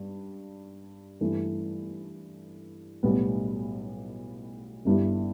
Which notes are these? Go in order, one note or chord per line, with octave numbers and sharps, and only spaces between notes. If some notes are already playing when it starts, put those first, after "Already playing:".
Already playing: G2
G2 E3 A3
B1 A2 G3 B3
G1 G2 G3 E4 G4